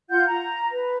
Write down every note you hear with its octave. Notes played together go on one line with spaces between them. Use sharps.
F4 F#5 G6
A#5
B4